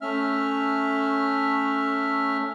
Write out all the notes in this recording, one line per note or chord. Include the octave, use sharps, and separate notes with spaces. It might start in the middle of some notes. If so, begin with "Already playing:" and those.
A3 C#4 E5 F6